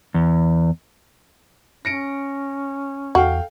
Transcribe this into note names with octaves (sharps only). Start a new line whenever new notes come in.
E2
C#4 A#6 C#7 D7
E2 F#4 A4 F5 G5